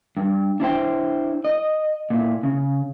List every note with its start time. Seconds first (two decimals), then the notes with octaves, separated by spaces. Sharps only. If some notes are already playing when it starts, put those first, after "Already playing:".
0.17 G2
0.60 D4 E4 C5 G5
1.44 D#5
2.10 A#2 E4
2.43 C#3